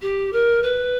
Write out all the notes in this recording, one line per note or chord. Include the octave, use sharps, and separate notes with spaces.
G4
A#4
B4